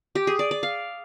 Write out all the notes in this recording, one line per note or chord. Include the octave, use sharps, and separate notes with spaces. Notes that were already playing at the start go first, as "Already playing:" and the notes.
G4
G#4
D5
D5
F5